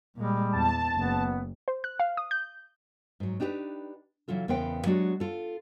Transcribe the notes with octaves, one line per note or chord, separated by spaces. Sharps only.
A#2 G3 G#3
E2 A5
F#1 B3
C5
F#6
F5
D#6
G6
G#2 F#3
D4 D#4 G4 G#4 B4
C#3 E3 F#3 F4 A4
E2 C#3 B3 A#4 C5 G5
F#3 G#3 D4 F#4 G4
F4 A4